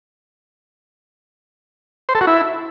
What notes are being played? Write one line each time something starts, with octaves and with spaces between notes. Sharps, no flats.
C5
A4
F#4
E4